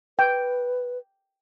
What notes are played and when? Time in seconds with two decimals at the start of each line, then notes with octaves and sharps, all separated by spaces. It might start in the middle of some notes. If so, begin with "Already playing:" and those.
0.19 B4 G5